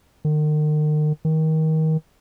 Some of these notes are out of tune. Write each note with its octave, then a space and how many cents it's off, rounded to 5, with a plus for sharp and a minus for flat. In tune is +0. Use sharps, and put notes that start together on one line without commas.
D#3 -40
D#3 +25